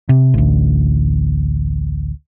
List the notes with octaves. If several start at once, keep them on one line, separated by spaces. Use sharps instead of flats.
C3
A1 D2